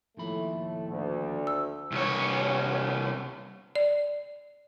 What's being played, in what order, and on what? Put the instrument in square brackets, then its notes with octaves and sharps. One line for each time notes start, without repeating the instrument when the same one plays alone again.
[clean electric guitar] D#2 F3 B5 [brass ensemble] A2 A3
[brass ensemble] D2
[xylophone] E6
[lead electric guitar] C2 C#5
[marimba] D5